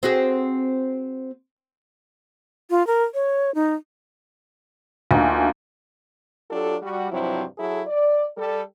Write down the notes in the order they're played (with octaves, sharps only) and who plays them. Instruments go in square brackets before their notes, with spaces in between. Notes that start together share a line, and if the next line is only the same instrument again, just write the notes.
[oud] C4 F#4 G#4
[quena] F4
A#4
C#5
D#4
[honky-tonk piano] D2 [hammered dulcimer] F3 A#3 D#4
[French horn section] F#3 D4 F4 G4 A4
G3 F#4
G2 C3 F3 F#3 C4 E4
F#3 E4 G#4 A4
D5
G3 A4